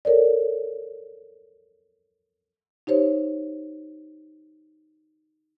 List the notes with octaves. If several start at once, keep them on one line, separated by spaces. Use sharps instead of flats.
A4 A#4 C#5 D5
D#4 G4 C5 C#5